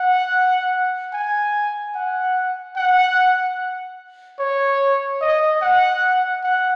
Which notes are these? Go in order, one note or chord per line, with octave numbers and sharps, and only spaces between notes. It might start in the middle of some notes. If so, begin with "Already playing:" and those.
Already playing: F#5
G#5
F#5
F#5
C#5
D#5
F#5
F#5